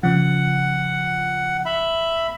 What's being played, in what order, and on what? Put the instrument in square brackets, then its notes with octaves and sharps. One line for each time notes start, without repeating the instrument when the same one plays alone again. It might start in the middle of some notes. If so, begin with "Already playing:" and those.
[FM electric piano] C#3 F3 [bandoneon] F#5
[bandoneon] E5 B5